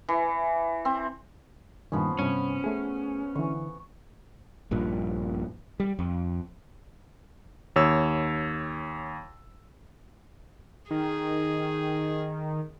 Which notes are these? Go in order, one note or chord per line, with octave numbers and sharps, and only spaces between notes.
E3
C4
G2 A#2 D#3 F3 B3 C#4
G2 C3 C#4 F#5 B5
A3 G#4
D3 E3 C#6
A#1 G2 A#2
G3
F2
D#2 C#5 E6
D#3 G#4